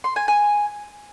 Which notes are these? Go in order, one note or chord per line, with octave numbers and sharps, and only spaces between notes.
C6
G#5
G#5